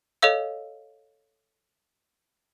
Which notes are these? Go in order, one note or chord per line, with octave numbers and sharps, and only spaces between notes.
A4 C#5 D#5 F5 E6